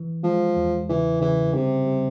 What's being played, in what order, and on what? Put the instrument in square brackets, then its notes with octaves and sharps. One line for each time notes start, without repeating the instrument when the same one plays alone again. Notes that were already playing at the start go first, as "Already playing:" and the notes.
Already playing: [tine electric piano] E3
[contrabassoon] F3 [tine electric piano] G#3
[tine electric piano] E2
[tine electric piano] C#3 [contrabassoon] E3
[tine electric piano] C#3 [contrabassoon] E3
[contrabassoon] C3 [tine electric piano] G3
[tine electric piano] G3